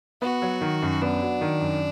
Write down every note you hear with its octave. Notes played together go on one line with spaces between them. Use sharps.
B3 F#4
F#3
D#3
F#2
B3 D4
F#3
D#3
F#2